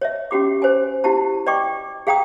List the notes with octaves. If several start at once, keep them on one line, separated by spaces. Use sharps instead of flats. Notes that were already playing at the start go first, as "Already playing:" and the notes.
C#5 D#5 E5
C#4 F#4 G4 D6
C5 C#5 G#5
E4 F#4 G4 A5
D5 D#5 G5 C#6 D6
G#4 F5 G5 A#5 D#6